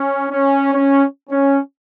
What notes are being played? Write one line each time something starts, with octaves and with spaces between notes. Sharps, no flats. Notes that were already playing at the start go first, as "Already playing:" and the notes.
Already playing: C#4
C#4
C#4
C#4